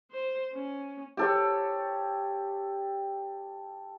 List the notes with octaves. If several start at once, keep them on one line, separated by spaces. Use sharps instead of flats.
C5
C#4
G4 A4 C#5